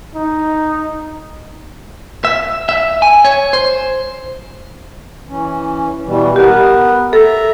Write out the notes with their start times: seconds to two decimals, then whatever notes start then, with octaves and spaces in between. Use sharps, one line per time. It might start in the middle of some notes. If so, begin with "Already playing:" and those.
0.15 D#4
2.25 E5
2.69 E5
3.02 G#5
3.25 C#5
3.53 C5
5.29 E3 C#4
6.06 B2 E3 G3
6.36 B3 G4 A#4 B4
7.13 A4 E5 A#5